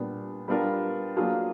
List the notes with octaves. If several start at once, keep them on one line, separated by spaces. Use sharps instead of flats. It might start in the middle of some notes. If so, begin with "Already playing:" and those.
Already playing: A#2 G3 B3 D4
G3 B3 D4 F4 A#4
F#3 A#3 D4 F4 G#4